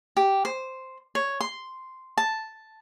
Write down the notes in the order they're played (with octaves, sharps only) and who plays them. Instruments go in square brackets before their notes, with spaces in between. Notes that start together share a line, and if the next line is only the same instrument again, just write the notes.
[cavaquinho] G4
C5
C#5
C6
A5